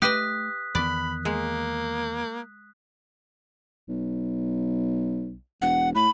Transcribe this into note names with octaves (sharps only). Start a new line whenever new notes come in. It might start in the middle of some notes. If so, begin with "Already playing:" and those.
A3 G4 B4 D#5 D#6 F#6 B6
E2 D#3 B3 D5 B5 F#6
G#3 A#3
B1
E1 F#5
A2 B5